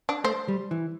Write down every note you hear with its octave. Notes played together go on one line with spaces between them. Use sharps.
D4
A3 C5
G3
E3